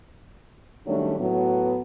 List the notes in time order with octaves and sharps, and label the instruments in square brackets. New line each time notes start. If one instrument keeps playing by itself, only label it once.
[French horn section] D#3 F#3 G3 A3 C#4 D4
A2 F#3 B3